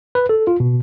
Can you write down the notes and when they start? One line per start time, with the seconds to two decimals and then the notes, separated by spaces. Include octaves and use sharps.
0.15 B4
0.29 A4
0.47 F4
0.60 B2